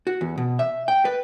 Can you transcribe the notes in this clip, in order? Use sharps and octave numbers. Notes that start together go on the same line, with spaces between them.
F#4
E2
B2
E5
G5
B4